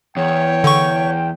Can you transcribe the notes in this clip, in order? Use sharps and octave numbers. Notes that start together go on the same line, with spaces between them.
E2 C#5 G5
D3 C#6